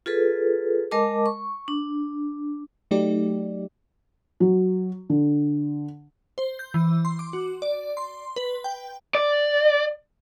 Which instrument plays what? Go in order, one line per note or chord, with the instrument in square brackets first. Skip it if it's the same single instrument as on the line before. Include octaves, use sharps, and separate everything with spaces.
[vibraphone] F4 G#4 A4 B4
G#3 A#4 D#5 A5 D6
C#6
D4
[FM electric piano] F#3 A3 D#4 G4 D5
[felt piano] F#3
D3
[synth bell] C5
G6
E3
C6
D6
F#4
D5
C6
B4
G5
[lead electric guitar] D5